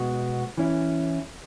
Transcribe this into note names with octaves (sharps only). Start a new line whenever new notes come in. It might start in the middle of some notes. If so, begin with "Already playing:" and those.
Already playing: B2 G#3 B3 F#4
E3 C#4 E4